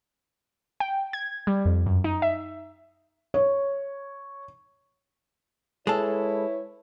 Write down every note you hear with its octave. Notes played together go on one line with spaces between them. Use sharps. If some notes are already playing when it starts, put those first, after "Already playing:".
G5
G#6
G3
F2
F#2
D#4
E5
C#5
G#3 E4 A4 B4 C#5